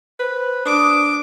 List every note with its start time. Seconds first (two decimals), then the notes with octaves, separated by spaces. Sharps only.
0.20 B4 C5
0.66 D4 D6 D#6